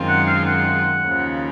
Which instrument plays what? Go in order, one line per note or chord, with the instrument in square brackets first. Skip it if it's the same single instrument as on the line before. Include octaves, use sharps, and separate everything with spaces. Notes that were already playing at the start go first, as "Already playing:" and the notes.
Already playing: [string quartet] F#2 D#3 G#3 C4 F4
[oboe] F#5
F5
F#5
[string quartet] D#2 C#3 F3